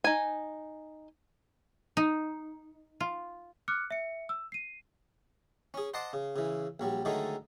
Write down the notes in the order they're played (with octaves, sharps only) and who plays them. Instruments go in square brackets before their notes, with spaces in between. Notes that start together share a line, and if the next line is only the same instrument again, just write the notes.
[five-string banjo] D#4 G#5
[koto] D#4
F4
[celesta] D6 F6 F#6 C#7
E5 C#7
E6
C7 D#7
[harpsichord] C#4 G#4
C5 D#5 F#5 A5 C6 D6
C#3
C#3 E3
A#1 F#3 G3
D3 D#3 F#3 G#3 A3 D#4